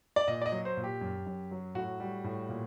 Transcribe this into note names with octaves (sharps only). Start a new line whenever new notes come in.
D5
A#2 D#5
D5
D#5
F#3
C5
A#2
G4
F#2
F#2
F#3
A2 F#4
G3
A2
A#2